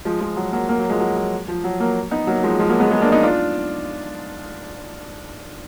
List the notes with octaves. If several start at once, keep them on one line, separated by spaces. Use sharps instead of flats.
F3 G#3
F3 G#3
F#3
F#3 A#3
F#3 A#3
F#3
F3 G#3
F#3
F#3
F3
F#3
F#3 A#3
B3 D#4
F#3 A#3
F3 G#3
F3 G#3
F#3 A#3
G#3 B3
G#3 B3
A#3 D4
B3 D#4
D4 F4